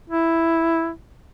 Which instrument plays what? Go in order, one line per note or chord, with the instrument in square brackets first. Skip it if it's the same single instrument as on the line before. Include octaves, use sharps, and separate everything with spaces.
[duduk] E4